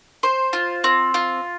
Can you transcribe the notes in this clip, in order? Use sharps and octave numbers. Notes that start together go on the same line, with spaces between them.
C5
F4
C4
F4